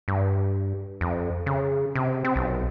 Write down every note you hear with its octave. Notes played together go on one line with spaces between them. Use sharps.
G2
F2
C#3
C3
C4
B1